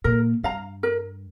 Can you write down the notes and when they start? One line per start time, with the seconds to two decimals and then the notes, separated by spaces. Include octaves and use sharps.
0.04 A#2 A#4
0.43 G2 F5 A#5
0.83 A#4